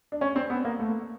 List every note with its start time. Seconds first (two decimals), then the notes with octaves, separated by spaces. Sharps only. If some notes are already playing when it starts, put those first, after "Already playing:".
0.12 D4
0.21 C#4
0.36 C4
0.50 B3
0.65 A#3
0.80 A3